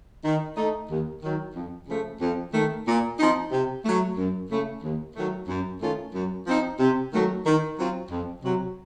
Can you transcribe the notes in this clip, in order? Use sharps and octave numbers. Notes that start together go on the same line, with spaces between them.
D#3
A3 D#4
D#2
D#3 F#3
F2
C#3 F3 A3
F2
D#3 A3
A#2
F3 C4 D#4
C3
F#3 A3
F#2
C#3 A3
D#2
D#3 F#3 A3
F#2
D#3 A3 C#4 F4
F#2
F3 C4 D#4
C3
D#3 F#3 A3
D#3
F#3 C4 F4
F2
C3 F#3